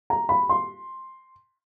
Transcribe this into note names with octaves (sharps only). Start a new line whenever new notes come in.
A#5
B5
C6